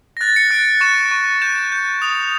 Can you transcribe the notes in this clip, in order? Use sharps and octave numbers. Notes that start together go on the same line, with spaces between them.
A#6
F#6 A6
C#7
F#6 D7
C#6 E7
C#6
G6 E7
G6
D#6 F7